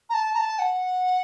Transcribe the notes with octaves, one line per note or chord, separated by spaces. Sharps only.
A#5
A5
A#5
A5
F#5